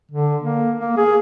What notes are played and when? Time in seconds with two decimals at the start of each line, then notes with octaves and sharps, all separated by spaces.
0.12 D3
0.43 A#3
0.79 A#3
0.97 G#4